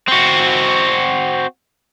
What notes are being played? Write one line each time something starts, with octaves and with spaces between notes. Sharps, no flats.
C4 F#4